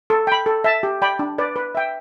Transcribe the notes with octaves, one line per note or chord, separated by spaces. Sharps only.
A4
G5 B5
A4
E5 A5
G4
D5 G5 B5
D4
B4 D5
B4
E5 G5